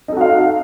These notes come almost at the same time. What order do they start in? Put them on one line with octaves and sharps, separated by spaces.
D#4 A4 F#4 F5